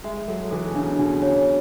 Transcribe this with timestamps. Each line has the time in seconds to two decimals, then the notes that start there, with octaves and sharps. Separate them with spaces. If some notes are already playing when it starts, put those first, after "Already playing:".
0.04 G#3 E5
0.28 F#3 A4
0.51 E3 A4
0.70 B2
0.75 C#3 D4
0.99 B2 D4
1.18 B2
1.22 C#3 C#5